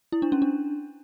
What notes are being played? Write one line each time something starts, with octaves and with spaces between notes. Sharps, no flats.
E4
D4
C#4
D4